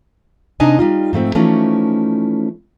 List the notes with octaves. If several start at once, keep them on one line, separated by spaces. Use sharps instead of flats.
C3 D4 D#4 D#5 G#5
G3 D#4 F4
G#2 F3 A3 C4
E3 F3 A3 C#4 D#4 E4